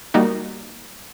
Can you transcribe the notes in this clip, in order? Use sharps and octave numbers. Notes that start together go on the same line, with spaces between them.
G3 A#3 D#4 F#4